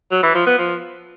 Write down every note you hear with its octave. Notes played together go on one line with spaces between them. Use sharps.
F#3
E3
F3
B3
F3